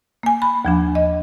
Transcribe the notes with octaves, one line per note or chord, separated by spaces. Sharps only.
A#3 G#5
B5
D#2 F3 D4
D#5